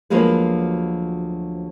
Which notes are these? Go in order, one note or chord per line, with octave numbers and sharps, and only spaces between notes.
D2 F3 F#3 G#3 A#3 B4